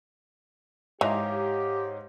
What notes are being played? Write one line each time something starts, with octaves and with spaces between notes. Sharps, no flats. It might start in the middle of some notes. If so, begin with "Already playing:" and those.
G#2 E3 G4 C#5 D#5 F5 A#5 C6